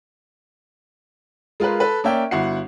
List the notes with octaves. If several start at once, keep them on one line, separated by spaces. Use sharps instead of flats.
G#3 F4 A#4 B4
A4 B4
A#3 C#4 C#5 D5 E5 G5
G1 E4 F#4 F#5 C7